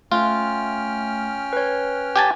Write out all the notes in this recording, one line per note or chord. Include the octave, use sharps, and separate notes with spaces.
A3 C#4 F4 G5 F6
B4 C#5
G4 G#5 A5